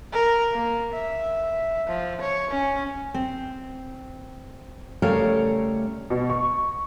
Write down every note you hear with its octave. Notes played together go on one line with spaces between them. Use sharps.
A#4
A#3
E5
F3
C#5
C#4
C4
C#3 G3 A3 A#4 C#5 F5
B2
C#6